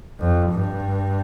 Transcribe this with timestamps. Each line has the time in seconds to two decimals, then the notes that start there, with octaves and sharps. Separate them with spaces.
0.20 F2
0.52 G2